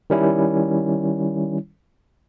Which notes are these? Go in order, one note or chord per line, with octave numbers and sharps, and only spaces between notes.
D#3 G3 C#4 E4